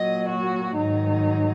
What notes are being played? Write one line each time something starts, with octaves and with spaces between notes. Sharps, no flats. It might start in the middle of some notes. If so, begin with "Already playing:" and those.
Already playing: A#2 F#3 D#5
F#4
G#2 D#3 F#3 D#4